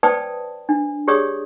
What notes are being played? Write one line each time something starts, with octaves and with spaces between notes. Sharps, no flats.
B4 C5 D5 G5 A5 D#6
D4
G4 G#4 C#5 D5 D#6